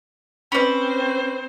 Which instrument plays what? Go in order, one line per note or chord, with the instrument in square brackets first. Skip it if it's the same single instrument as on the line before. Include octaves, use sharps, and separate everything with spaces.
[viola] C4 C5 [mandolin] C#4 D5 [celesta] B4 B5